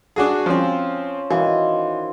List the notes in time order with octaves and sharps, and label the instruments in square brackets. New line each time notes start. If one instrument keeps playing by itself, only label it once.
[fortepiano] D4 F#4 G#4
[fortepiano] F3 C4 [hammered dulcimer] C#4 F4
[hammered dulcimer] D#3 C5 [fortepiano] E3 [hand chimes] F#4 F5